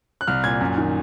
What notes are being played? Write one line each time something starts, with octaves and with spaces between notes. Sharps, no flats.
F#6
C2 F6
A#2 G#6
F#2
D#3